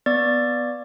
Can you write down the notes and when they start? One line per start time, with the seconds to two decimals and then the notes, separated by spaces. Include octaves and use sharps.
0.06 B3 D5 A6